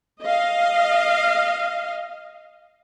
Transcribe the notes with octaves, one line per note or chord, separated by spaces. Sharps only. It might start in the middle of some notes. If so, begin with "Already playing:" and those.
D#5 F5